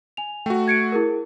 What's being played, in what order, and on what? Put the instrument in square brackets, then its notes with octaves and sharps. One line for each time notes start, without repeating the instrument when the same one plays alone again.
[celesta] G#5 F7
[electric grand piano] A3 F#4 [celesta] G5
[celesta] G#6 C#7 D7
E4 G#4 A#4